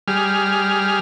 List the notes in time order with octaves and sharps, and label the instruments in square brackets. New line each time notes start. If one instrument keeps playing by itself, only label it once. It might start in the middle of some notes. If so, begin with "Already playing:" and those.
[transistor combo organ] G3 G#4 F6